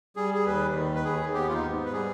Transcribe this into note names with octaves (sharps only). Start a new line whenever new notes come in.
G3 G#4
G#4
D#2 B4
D#3
B4
D#2 G#4
B3 G4
F4
D#4
G#2
B4
G3 G#4